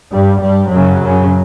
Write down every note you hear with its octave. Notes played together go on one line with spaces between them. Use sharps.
G2 G3
G2 G3
F#2 C#3 F#3
F#2 C#3